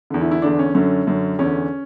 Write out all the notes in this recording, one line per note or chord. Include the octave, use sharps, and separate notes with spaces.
E2 D3
E4
E4
E2 D3 D4
C#4
F#2 D3 C#4
F#2 D3
E2 D3 C#4